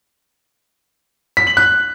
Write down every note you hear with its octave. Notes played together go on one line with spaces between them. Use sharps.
B6
F#7
F#6